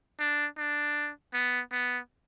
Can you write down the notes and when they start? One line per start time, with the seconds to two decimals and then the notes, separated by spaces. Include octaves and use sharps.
0.20 D4
0.58 D4
1.34 B3
1.72 B3